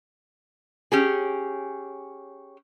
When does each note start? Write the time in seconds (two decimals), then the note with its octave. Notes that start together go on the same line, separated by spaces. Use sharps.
0.92 C#4 G4 G#4